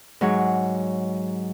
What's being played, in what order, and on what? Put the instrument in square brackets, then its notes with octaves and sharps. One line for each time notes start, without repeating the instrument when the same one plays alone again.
[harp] G#2 F#3 C#5